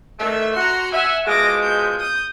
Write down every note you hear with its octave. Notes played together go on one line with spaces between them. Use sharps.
D#3 E3 A3 E5
F#4 A#5 C6
E5 F#5 G#5
B2 F3 G#3 D6 A#6
G6
D#6 G6